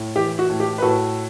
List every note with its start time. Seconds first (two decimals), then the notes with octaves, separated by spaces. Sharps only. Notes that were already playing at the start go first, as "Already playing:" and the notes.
Already playing: A2
0.16 E3 G4
0.39 F#4
0.50 A2
0.60 G4
0.78 B4
0.82 A2 F#4 A4